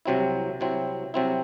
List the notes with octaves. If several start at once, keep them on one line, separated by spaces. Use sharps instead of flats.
C2 C3 F#3 C4 E4
C2 C3 F#3 C4 E4
C2 C3 F#3 C4 E4